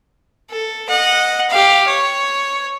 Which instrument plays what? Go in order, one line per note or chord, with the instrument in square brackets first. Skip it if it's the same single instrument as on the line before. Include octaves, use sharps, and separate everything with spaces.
[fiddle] A4
D#5 F#5
G4 F5
C#5